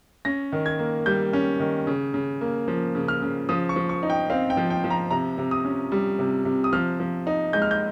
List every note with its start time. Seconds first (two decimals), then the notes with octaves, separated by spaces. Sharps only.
0.25 C#4 A#6
0.52 D#3
0.66 G#6
0.79 A#3
1.06 G3 G6
1.33 C#4
1.60 D#3
1.87 C#3
2.14 C#3
2.41 A#3
2.68 F3
2.95 C#3
3.08 F6
3.22 C#3
3.49 F3 D#6
3.69 C#6
3.76 F3
3.89 C#6
4.03 D#4
4.10 G5
4.30 C4 F5
4.50 G5
4.57 F3
4.70 G5
4.84 F3
4.90 A#5
5.11 C3 A#5
5.38 C3
5.51 D#6
5.65 C#4
5.92 G3
6.19 C3
6.45 C3
6.64 D#6
6.73 F3 F6
7.00 F3
7.27 D#4
7.53 G#3 G6
7.62 F6
7.71 G6